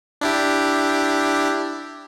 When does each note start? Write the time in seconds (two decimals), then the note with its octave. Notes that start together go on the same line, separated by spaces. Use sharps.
0.21 D4 E4 G4